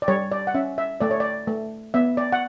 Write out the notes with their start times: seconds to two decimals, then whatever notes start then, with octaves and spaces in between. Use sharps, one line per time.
0.02 D5
0.08 G3 C#5
0.32 D5
0.47 F#5
0.54 C#4 E5
0.78 E5
1.01 A3 D5
1.11 C#5
1.20 D5
1.48 A3
1.94 B3 E5
2.17 D5
2.32 F#5